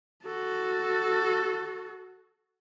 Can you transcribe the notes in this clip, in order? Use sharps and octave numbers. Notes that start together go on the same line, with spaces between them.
F#4 A4